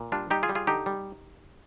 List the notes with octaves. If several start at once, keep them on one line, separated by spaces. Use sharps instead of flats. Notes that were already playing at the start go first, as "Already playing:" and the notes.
Already playing: A#2
G3 D4 F4
G3 D#4 G4
F4 G#4
G3
F4 G#4
D3 D#4 G4
G3